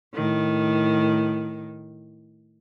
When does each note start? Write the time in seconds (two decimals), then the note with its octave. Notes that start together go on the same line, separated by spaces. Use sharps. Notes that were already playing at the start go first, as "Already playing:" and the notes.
0.14 A2 D#3